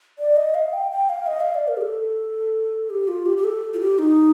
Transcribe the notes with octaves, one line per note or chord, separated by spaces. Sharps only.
D5
D#5
F5
G5
G5
F5
D#5
F5
D5
A#4
G4
A4
G4
F4
G4
G4
A4
F4
G4
D#4